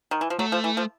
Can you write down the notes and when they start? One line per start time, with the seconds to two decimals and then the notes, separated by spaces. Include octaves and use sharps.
0.11 D#3
0.21 E3
0.30 F3
0.39 F#3 A3
0.52 F3
0.64 E3
0.77 F3